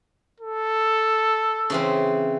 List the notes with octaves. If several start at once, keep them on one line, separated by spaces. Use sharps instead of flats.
A4
C#3 E3 C4